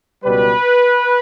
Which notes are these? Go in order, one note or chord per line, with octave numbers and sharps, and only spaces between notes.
C#2 B2 G3 B4